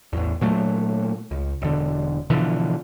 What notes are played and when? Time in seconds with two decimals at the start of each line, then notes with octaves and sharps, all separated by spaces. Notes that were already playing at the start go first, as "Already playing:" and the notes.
0.13 A1 E2
0.41 A#2 F#3 A3
1.31 C#2
1.62 E1 D3
2.30 B2 D3 E3 F3